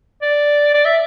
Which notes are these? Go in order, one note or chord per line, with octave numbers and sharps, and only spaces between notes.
D5
D5
E5